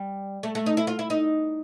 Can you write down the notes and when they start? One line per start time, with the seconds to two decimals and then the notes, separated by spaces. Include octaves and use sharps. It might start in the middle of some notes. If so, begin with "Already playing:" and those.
Already playing: G3
0.43 A3
0.55 A3
0.66 D#4
0.77 E4
0.87 F4
0.99 E4
1.10 D#4